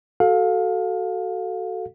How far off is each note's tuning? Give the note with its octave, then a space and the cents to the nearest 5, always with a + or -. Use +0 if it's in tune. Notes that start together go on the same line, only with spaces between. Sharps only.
F#4 +15 A4 +0 F5 +25